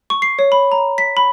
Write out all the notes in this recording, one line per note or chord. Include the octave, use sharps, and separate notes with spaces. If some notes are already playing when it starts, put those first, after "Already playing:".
C#6
C7
C#5
B5
A#5
B6
B5